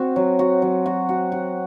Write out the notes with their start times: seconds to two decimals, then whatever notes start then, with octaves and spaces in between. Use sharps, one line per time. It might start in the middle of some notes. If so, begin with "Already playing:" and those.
Already playing: C4 F#4
0.16 F#3
0.39 F#4
0.62 F#3
0.86 F#4
1.09 F#4
1.32 F#4